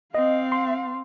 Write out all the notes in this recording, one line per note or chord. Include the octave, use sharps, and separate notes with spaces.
C4 D#5 F5
C6